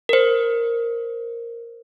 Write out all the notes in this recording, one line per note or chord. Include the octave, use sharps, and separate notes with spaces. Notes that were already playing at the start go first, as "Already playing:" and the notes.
A#4 C5